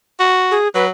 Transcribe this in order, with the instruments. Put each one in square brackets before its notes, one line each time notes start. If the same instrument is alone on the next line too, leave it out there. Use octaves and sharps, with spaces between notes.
[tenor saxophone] F#4
[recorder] G#4
[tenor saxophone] F#3 [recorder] B4